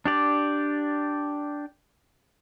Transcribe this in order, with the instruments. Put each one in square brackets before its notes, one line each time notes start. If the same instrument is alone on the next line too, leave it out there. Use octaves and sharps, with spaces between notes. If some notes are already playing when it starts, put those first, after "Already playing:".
[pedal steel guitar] D4 G4 D5